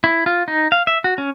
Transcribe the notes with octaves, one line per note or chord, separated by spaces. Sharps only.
E4
F4
D#4
F5
E5
F#4
C#4